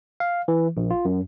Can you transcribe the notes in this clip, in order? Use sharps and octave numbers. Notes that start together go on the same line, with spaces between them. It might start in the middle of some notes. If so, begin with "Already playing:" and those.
F5
E3
A#1
F4
F#2